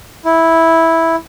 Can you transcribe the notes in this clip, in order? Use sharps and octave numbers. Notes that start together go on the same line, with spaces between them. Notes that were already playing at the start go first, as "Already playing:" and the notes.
E4